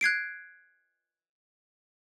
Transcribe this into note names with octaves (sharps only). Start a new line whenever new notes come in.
F#6 G#6 C7 D7